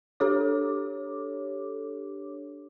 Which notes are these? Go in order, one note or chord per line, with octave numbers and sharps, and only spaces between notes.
D4 G4 A4 C#5 D6